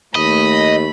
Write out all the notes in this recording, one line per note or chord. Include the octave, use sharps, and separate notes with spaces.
D#2 A3 D#5 B5